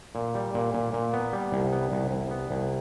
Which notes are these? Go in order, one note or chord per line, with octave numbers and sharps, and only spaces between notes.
A#2
G3
A#2
A#2
A#2
B3
G3
C2
B3
C2
C2
B3
C2